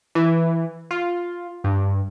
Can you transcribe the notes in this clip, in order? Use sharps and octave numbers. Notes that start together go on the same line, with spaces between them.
E3
F4
G2